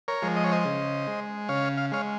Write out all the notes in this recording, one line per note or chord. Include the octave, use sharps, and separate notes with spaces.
A#4 C#5
F3 G#3
D#5
C#5
C5 D#5
C#3
G#3
C#3 C#5 F5
F5
G#3 C#5 F5